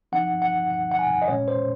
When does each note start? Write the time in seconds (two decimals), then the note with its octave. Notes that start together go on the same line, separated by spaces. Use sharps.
0.12 F3 C4 D#4 F#5
0.42 F#5
0.70 F#5
0.91 F#5
0.99 G#5
1.22 D#5
1.28 A#2 G#3 C#4 C#5
1.48 C5